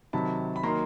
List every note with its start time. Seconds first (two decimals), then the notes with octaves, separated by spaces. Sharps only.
0.13 C3 D#3 F#3 A5 B5
0.56 B5
0.63 D#3 F#3 A#3 A#5 C6